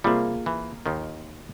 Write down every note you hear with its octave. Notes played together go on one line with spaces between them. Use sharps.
C3 G3 A#3 F4 G#4
E3
D#2 D#3